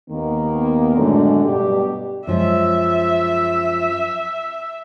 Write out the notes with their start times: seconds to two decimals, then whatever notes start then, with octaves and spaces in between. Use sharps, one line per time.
0.10 D#2 D#3 A#3 B3
0.96 F#2 A2 D3 G#3 A3 D4
1.45 G2 B2 D4 G4
2.27 F#2 F3 G#3 E5